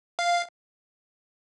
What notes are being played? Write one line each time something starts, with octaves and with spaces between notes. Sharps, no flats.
F5